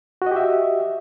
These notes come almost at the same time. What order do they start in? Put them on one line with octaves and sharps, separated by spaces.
F#4 D#5 G4 E5